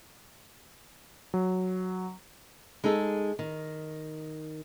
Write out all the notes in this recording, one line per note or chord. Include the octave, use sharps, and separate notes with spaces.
F#3
G#3 D#4 G#4 A4
D#3